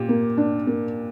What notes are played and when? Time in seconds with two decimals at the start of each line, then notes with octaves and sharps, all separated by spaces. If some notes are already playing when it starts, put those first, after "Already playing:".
Already playing: A#2 G4
0.09 A#3
0.38 D4
0.67 A#3